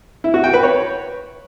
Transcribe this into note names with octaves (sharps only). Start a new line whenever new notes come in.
E4
F#4
G5
B4
C#5